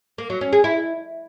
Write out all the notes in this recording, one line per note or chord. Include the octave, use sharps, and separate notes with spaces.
A#3
F#3
C#4
G#4
E4